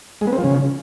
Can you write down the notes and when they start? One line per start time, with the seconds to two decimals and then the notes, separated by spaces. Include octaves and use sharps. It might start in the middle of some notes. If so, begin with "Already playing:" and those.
0.21 G#3
0.27 B3
0.33 C4
0.38 F3
0.44 C#3